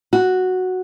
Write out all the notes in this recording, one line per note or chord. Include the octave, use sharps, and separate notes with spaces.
F#4